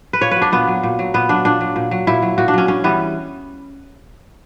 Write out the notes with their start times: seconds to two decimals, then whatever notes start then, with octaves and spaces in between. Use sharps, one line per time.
0.13 B4
0.21 A#2 C#5
0.31 F#3 B4
0.42 D4
0.52 A#2 B3
0.68 F#3
0.83 A#2
0.99 F#3
1.14 A#2 B3
1.29 F#3 D4
1.45 A#2 D4
1.61 F#3
1.76 A#2
1.91 F#3
2.07 A#2 E4
2.22 F#3
2.38 A#2 F#4
2.48 D4
2.53 F#3 C#4
2.68 G2 C#4
2.84 E3 G3 B3